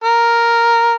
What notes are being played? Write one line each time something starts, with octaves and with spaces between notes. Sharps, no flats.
A#4